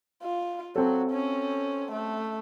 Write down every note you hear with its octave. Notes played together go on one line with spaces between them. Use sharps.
F4
F#3 C4 A4
C#4
A3